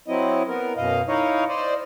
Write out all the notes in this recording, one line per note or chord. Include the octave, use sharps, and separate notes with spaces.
F#3 C4 E4 D#5
B3 A#4
F#2 B2 D#5 F5
D#4 E4 C#5 D#5 F5
C5 D5 D#5